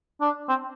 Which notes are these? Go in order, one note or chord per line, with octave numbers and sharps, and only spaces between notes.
D4
C4